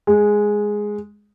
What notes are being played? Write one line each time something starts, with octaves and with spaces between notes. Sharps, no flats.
G#3